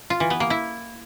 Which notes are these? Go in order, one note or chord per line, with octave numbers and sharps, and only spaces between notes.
F4
E3
B3
A#3
E4